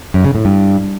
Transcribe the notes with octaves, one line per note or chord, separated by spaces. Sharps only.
F#2
C#3
A2
G2